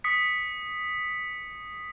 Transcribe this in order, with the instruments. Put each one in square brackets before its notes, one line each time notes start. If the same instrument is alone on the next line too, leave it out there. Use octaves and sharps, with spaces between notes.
[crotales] D#6 B6 C#7